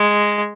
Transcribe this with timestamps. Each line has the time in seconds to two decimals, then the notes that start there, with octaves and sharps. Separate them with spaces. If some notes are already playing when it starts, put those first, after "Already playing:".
Already playing: G#3